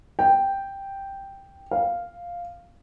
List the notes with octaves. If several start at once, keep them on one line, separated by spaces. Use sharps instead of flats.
G5
F5